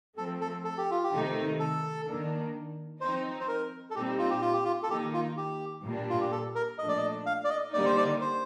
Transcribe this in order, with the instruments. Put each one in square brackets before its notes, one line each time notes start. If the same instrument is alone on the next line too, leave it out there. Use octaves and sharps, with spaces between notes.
[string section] F3 A3 C4 [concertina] A4
[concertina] A4
A4
G4
F4
G4
[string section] C3 D#3 A3 D#4
[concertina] A4
[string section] D#3 A#3 D4
[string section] F3 C4 D#4 [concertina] C5
[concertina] C5
A#4
A4
[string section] A#2 G3 C4 D#4 [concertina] G4
[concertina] F4
G4
F4
G4
F4
A4
[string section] D#3 A#3 D#4 [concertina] G4
[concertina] F4
G4
[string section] A#2 G3 D4
[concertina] F4
G4
A4
A#4
[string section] A#2 F3 A3 D4 [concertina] D#5
[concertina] D5
D#5
F5
D5
D#5
[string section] D3 G3 A#3 D#4 [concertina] D5
[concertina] C5
D5
C5